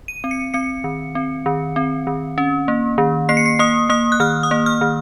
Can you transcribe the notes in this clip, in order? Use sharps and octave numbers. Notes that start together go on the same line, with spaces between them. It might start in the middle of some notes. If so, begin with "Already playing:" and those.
D#7
C4
C#7
C4 C#7
D#3
C4
D#3
C4
D#3
C#4
A#3
D#3
A#3 C7
C#7
C7
A#3 D#6
A#3 D#6
F#6
D#3 F6
D#6
A#3
F6
D#3